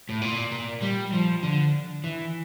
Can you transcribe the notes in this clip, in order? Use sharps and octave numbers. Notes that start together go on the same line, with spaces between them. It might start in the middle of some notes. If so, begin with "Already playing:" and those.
A2
A#2
A#2
G3
F3
D3
E3